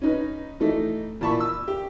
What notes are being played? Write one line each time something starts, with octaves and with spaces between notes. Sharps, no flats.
C#4 D#4 B4
E3 A3 D#4
A#2 E3 A5 B5 C#6
E6
G4